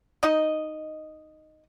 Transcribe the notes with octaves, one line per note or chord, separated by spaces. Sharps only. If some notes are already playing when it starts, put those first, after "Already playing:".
D#4 D#5